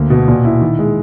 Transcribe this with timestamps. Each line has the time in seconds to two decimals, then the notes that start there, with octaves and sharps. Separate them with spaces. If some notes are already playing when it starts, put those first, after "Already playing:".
Already playing: D2 A#3
0.10 B2
0.28 A#2
0.45 E4
0.61 D#3
0.79 G#3